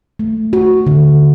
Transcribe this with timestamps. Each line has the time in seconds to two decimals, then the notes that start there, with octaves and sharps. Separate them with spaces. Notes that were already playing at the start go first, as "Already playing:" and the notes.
0.19 A3
0.53 F#4
0.87 D3